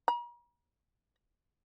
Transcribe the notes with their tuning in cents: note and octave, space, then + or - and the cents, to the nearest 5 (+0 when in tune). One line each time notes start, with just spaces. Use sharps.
A#5 +45